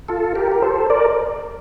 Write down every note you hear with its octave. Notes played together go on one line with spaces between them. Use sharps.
F4 A4
G4 A#4
A#4
A4 C5
A#4 D5